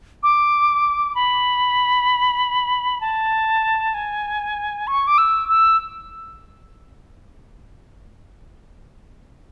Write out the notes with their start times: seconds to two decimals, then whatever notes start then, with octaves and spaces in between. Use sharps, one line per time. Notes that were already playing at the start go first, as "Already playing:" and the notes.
0.23 D6
1.15 B5
3.01 A5
3.94 G#5
4.87 C#6
5.07 D6
5.18 E6
5.49 E6